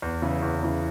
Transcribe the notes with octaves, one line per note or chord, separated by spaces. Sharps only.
E2
C#3 E3
E2
C#3 E3